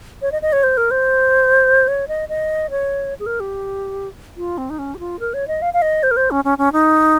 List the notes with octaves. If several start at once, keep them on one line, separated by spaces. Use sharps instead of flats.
C#5
D#5
D#5
C#5
C5
A#4
C5
C#5
D#5
D#5
C#5
G#4
A#4
G4
F4
C4
D#4
C#4
G4
F4
A#4
C#5
D#5
F5
F5
D#5
C5
A#4
C5
C#4
C#4
C#4
D#4